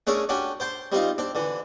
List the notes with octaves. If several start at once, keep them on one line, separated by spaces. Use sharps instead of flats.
A3 C#4 D4 G#4 A#4 E5
C#4 D4 F#4 G4
C5 G5 A5 C6
G3 C4 D#4 F4
C4 D4
D3 E3